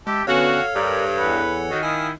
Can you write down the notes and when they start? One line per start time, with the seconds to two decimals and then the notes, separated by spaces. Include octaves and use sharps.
0.07 G#3 G4 E5 A5
0.27 D3 B3 C#4 F#4 A4 C#5 F5
0.75 G2 A#4 D5
1.18 E2 E3 B4 F#5
1.70 D#3 F#4
1.83 E4 F5 G#5 D#6